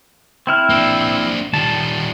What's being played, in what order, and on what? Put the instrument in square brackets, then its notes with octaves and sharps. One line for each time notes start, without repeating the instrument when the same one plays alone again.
[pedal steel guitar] C4 E4 F6
[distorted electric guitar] A#3 D4
[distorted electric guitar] D#3 G3 [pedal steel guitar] A5